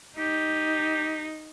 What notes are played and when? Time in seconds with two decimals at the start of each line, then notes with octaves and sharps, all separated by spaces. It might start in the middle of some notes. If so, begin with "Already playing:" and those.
0.19 D#4 G4